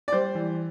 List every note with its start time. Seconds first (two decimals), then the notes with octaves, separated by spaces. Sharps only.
0.08 D5
0.12 G3 C5
0.35 E3